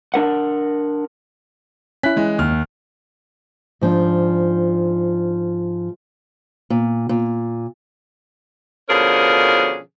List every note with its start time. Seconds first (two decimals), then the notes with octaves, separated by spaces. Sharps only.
0.14 D4 A#4 F#5
2.03 C#4 E4 F#6 B6
2.16 E3 G#3
2.38 D#2 F6
3.81 G#2 F3 D4
6.70 A#2
7.09 A#2
8.89 B2 D3 F3 C#4 G#4 A#4